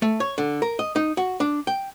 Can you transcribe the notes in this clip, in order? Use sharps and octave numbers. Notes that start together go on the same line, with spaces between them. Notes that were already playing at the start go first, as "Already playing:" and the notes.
A3
C#5
D3
A#4
D#5
D#4
F#4
D4
G5